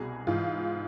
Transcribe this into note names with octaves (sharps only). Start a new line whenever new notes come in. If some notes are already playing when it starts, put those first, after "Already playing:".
Already playing: C2 B2 G#4
G#2 E3 F4